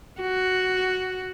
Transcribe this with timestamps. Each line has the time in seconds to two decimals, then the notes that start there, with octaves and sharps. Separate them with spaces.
0.20 F#4